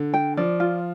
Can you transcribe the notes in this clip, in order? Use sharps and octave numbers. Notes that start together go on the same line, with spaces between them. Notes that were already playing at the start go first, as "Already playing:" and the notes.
Already playing: D3
G5
F3 D5
F4